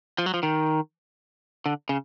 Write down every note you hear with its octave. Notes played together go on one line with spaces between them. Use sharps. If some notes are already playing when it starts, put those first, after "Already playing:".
F3
F#3
F3
D#3
D3
C#3